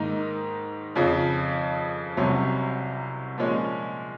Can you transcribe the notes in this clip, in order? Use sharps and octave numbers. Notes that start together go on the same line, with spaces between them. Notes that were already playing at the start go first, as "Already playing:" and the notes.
Already playing: G#2 D#3 A#3 D#4
F2 C#3 F3
C2 C3 F#3 C#4
A#2 F3 G#3 C#4